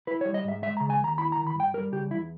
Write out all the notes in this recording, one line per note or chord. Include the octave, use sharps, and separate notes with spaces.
E4 B4
C#5
G3
D#5
G#2 E5
G#3 E5
A#5
C#3
G#5
D#2 A#5
E4 B5
A#5
D#3
B5
G2 G5
G3 A#4
C#3 G4
E2 E4